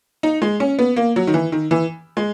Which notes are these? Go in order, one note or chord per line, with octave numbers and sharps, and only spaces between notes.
D#4
G#3
C#4
B3
A#3
F#3
D#3
E3
D#3
E3
G#3